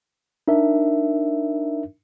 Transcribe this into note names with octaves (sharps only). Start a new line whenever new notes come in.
D4 D#4 A#4 E5